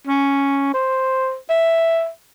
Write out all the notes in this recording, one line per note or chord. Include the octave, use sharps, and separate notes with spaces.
C#4
C5
E5